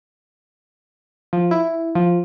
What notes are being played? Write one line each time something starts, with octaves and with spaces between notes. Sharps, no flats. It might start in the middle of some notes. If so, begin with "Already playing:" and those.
F3
E4
F3